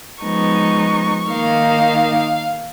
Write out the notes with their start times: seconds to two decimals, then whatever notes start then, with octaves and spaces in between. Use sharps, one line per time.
0.23 F3 G#3 B3 D#4 C#6
1.29 D#3 A#3 D#4 F5